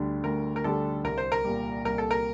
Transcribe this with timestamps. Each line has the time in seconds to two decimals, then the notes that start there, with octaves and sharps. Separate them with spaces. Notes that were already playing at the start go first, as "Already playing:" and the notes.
Already playing: D2 D3 G3 D4
0.24 D2 A#4
0.56 A#4
0.64 D3 G3 D4 A4
1.04 C2 A#4
1.18 C5
1.32 A#4
1.45 A#2 G3
1.85 C2 A#4
1.98 A4
2.11 A#4